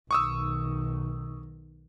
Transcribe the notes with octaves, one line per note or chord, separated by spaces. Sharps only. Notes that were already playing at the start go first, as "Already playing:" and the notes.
B1 D#3 C#6 D#6 E6